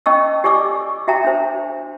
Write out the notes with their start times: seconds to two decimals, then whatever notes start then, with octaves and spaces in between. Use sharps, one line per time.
0.06 C#4 D#5 G5 A5 C#6 E6
0.44 G4 D5 G#5 C#6 D6 E6
1.08 F#4 E5 G5 A5 A#5
1.24 D4 C5